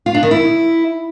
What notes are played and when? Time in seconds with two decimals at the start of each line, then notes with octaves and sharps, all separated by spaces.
0.06 F4
0.14 D4
0.23 D#3
0.31 E4